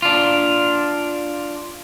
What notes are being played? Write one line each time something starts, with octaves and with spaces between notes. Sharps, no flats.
D4 F4